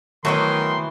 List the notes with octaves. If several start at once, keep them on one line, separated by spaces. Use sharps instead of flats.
D#3 E3 F#3 A3 B3 F#4 C6